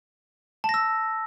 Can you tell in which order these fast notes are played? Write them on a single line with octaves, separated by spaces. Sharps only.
A5 A#6 E6